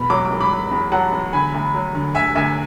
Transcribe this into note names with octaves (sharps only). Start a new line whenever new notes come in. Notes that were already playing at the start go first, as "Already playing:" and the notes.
Already playing: E2 B2 B5
F#3 D6
D6
E2
B5 D6
F#3
E2
F#3 F#5 A5
E2
D3 G#5 B5
D2
F#3
D3
D2 E5 G#5
D2 E5 G#5